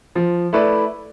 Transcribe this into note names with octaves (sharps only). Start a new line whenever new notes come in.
F3
A3 E4 B4 D5